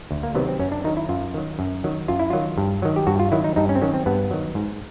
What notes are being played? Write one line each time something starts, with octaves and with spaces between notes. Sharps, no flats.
D2
A#3
C3 D#3 F#3 B3
C4
F#2 C#4
D4
D#3 F#3 D#4
E4
F#2 F4
D#3 F#3
F#2
D#3 F#3
F#2 F4
E4
D#3 F#3 F4
G2
D#3 F#3
G4
G2 F#4
F4
D#3 F#3 E4
D#4
G2 D#4
C#4
C4
D#3 F#3 C#4
C4
G2 B3
D#3 F#3
G#2